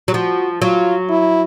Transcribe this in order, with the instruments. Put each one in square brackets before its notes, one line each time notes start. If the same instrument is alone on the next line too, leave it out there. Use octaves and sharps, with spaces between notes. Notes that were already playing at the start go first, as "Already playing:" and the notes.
[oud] F#3
[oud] F3 [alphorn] F#4
[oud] F#3 [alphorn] F4
[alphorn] E4